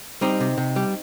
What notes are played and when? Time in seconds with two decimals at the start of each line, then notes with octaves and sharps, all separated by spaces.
0.21 G3 C4 D#4
0.40 C3
0.58 C3
0.76 G3